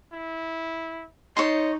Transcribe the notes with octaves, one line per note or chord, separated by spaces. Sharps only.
E4
D#4 C#5 D#5 A5 C6